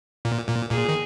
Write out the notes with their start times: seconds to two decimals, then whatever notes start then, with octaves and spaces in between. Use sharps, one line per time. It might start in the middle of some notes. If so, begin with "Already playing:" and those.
0.25 A#2
0.49 A#2
0.71 A#2 G#4
0.89 D#3